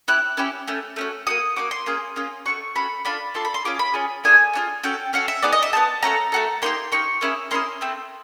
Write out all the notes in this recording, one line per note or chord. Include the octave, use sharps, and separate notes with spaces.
C#4 E4 G4 F#6
C#4 E4 G4
A3 C#4
A3 C#4 F#4
A#3 D#4 F#4 D#6
A#3 D#4 F#4 D6
C6
A#3 C#4 F4 G#4
A#3 C#4 F4 G#4
A3 C#4 F#4 C#6
A3 C#4 F#4 B5
D4 F4 A4 B5
D4 F4 A4 C6
B5
C6
C#4 F4 G#4 D6
B5
C#4 F4 G#4
A3 D4 F4 G#4 G#5
A3 D4 F4 G#4
C#4 F#4 A4 G5
C#4 F#4 A4 F5
E5
B3 D#4 G#4 D5
D#5
E5
B3 D#4 G#4 A5
A3 C#4 F#4 A4 A#5
A3 C#4 F#4 A4
A#3 D#4 G4 C6
A#3 D#4 G4 C#6
A#3 C#4 E4 G#4
A#3 C#4 E4 G#4 C6
A3 C4 E4